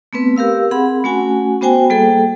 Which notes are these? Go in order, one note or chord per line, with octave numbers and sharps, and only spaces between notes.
A3 B3 C4 B4
G4 A#4 F5 E6
C4 G#4 F#5 B5
A3 C#4 F#4 F#5 G#5
B3 F#4 C5 G5 G#5
G3 A#3 G#4 A4 G5